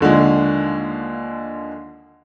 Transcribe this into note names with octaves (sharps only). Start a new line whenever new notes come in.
D#2 D3 F3 G#3